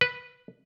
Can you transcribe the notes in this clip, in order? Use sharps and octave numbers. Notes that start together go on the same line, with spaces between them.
B4